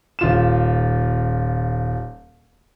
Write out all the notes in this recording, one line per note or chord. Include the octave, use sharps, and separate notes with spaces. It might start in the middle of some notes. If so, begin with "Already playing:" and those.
D#1 F4 E7